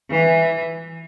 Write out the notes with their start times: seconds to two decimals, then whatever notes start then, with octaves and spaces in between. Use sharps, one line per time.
0.11 E3